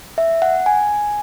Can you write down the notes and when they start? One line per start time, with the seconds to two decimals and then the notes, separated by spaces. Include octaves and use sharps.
0.18 E5
0.42 F#5
0.66 G#5